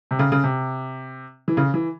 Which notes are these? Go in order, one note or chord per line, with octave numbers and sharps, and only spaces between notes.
C3
C#3
C#3
C3
E3
C#3
E3